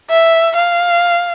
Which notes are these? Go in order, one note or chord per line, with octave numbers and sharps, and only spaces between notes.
E5
F5